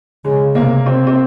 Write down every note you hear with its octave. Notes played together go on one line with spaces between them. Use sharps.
C#3 G#3
C3 A#3
C4
C4